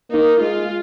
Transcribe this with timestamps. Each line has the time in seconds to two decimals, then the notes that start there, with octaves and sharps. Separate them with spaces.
0.11 A#3 D#4
0.41 G#3 F4